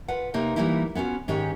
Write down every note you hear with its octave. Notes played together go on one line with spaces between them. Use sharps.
F4 B4 F#5
C3 A#3 D#4 C#5
E3 F#3 G3 A#3 D#4 E4
B3 C#4 F4 F#4
G#2 D#3 C#4 D#4 G4 C#5